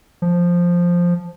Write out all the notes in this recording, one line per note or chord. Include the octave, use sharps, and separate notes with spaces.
F3